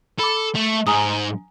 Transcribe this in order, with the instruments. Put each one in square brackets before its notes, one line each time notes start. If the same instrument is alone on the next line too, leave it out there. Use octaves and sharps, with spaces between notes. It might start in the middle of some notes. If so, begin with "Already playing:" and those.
[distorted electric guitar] A4 [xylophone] B5 D6
[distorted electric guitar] A3
[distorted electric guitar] G#2 [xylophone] G#5 A#5 D#6